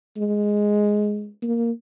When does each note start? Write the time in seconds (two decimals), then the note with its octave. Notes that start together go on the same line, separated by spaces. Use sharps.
0.17 G#3
1.43 A#3